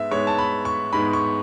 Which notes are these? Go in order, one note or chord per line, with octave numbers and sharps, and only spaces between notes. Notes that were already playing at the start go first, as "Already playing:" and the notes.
Already playing: G#2 G#3 B3 E5
G#2 G#3 B3 C#5
A5
B5
C#6
G#2 G#3 B3 B5
C#6